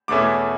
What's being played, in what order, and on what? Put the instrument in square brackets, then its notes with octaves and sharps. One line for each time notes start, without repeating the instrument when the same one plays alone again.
[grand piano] E2 B2 A3 C#4 E4 D6